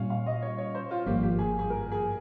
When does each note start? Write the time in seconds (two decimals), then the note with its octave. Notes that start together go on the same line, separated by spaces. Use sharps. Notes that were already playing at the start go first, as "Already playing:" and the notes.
Already playing: A#2 G3 C#4 F4 C#5 F5
0.10 F5
0.26 D#5
0.42 C#5
0.58 C#5
0.75 C5
0.91 F4
1.06 G#1 G2 F3 A#3 G4
1.23 G4
1.39 G#4
1.59 G#4
1.70 A#4
1.92 G#4